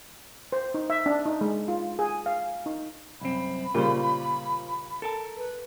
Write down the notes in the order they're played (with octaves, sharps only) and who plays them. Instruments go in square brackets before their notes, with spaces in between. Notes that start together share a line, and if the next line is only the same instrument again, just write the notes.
[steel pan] C5
D#4
E5
D4
D#4
G#3
F4
G#4
F5
D#4
[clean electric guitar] C2 F#2 C4 [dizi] B5
[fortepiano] A#2 C#3 G3 [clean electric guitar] F4 C5
[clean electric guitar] A4 A#4 A5
[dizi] B4